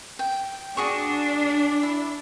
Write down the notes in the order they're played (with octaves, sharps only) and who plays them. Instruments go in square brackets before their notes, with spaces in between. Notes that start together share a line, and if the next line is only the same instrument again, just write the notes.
[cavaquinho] G5
[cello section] D4 [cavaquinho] F#4 G#4 C#6
[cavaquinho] E4